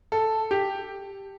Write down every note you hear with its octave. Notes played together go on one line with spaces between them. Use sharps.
A4
G4